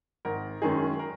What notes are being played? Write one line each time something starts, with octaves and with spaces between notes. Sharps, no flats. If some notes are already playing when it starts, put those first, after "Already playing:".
G#1 A#4
F#2 D#3 G#3 C#4 G#4
A#4